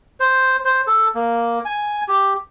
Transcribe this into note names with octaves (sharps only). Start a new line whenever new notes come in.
C5
C5
A4
A#3
G#5
G4